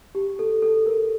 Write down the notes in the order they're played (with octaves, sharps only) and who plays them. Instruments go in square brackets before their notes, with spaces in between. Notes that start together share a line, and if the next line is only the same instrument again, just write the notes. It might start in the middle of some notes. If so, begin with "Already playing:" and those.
[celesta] G4
A4
A4
A#4